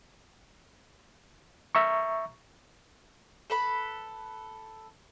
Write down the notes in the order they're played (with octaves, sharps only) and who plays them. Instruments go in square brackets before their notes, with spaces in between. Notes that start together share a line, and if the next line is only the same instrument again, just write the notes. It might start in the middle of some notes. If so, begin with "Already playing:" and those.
[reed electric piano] E5 A#5 C#6
[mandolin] A4 B4 B5